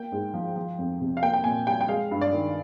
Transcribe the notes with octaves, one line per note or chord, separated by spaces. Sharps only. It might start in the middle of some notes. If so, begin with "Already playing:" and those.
Already playing: A#3 G5
G#2
F3
F3
F2
C3
F5
A#3 G5
G5
A#2 G#5
G3 G5
G5
G#3 F5
G2
D5
D#3